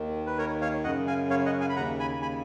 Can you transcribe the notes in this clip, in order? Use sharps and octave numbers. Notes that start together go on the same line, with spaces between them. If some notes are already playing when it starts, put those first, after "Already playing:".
Already playing: D#2 D#3
B4
A#4 C#5
C#5 F5
F#2 C#3 D#5 F#5
F5 G#5
C#5 F5
D#5 F#5
F5 G#5
B5
D#2 C#3 F#5 A#5
G#5 B5
G#5 B5